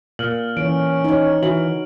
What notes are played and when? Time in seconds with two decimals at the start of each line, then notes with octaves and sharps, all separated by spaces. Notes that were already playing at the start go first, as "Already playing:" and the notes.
0.19 A#2 F6 F#7
0.57 E3 C#4 D7
1.04 D#4 C#5
1.43 E3 F#4 F#7